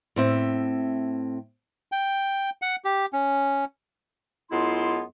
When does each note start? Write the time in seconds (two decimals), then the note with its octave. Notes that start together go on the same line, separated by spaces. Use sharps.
0.16 A2 C4 E5
1.92 G5
2.62 F#5
2.85 G4
3.13 C#4
4.51 F#2 G#3 B3 E4 F4 C6